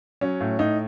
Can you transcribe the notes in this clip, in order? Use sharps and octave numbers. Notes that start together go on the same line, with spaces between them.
F#3 C#4
A2
A2 D#4